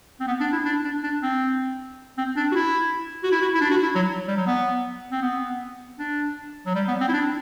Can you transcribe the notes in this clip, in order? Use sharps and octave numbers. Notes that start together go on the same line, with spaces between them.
C4
B3
D4
E4
D4
D4
D4
C4
C4
D4
F#4
E4
F#4
E4
F#4
E4
D4
F#4
E4
F#3
G3
F#3
B3
C4
B3
D4
F#3
G3
B3
C4
E4
D4